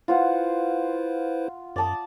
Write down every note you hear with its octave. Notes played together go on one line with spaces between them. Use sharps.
E4 F4 B4 C5 F#5
F#2 D5 A5 D#6